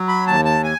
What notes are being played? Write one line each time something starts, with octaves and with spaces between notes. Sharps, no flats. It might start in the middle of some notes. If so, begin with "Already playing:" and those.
Already playing: F#3
B5
D#2 A5
A5
G#5